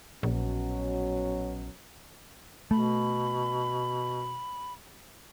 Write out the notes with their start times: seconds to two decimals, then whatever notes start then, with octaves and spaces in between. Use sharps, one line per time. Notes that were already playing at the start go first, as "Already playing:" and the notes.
0.23 A#1 B2 F#3 C#4
2.71 B2 A3 B5